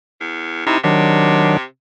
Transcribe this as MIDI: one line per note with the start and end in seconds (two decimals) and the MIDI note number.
0.21 0.63 40
0.67 0.78 48
0.67 0.78 63
0.67 0.78 64
0.84 1.64 48
0.84 1.57 51
0.84 1.57 54
0.84 1.57 62